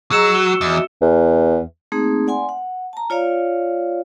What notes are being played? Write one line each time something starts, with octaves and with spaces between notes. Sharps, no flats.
F#3 G#4 D#5 A#5 E6 C#7 E7
F#4 G7
E2 F#4 D#5 E5
E2
A3 A#3 C4 D#4 G#4
D5 F#5 G#5 C6
F#5
A5 A#5
F4 C#5 D5 F5